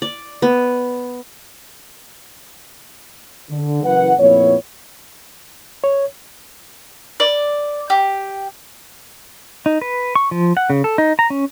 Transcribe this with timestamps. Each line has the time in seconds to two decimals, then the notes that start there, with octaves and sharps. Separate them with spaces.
0.02 D5
0.42 B3
3.51 D3
3.83 F#1 E3 B4 F#5
4.18 F2 A#2 B3 E4 C#5
5.84 C#5
7.20 D5
7.90 G4
9.66 D#4
9.81 B4
10.15 C#6
10.31 F3
10.57 F#5
10.70 C#3
10.84 A4
10.98 D#4
11.19 A#5
11.30 C#4